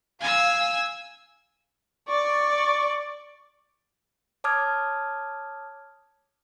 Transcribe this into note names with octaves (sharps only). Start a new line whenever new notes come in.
F5 G#5 E6
D5 C#6
C#5 A5 D6 D#6 F6 G#6